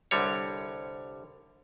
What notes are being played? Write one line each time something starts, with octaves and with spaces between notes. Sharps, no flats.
C2 D3 G3 C#5